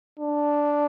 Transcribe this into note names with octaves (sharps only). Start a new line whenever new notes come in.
D4